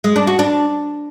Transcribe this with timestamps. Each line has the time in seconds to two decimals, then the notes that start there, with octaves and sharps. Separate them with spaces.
0.04 G#3
0.16 D4
0.27 F#4
0.39 D4